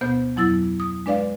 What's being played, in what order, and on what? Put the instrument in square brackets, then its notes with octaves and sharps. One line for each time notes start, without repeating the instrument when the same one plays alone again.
[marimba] D2 B2 B3 C5 G6
F2 F#3 E4 E6 A6
D#6
G#3 D4 B4 D5 F5